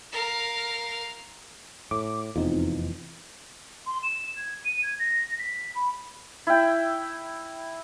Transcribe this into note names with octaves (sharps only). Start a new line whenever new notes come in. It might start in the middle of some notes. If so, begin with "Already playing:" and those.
A#4 F5
A2 D6
F1 E2 C4 D#4 F4
C6
E7
G#6
D#7
G#6
A#6
B6
B5
E4 G5